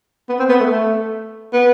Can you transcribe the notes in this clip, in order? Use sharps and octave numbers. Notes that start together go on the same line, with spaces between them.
B3
C4
B3
A3
A3
B3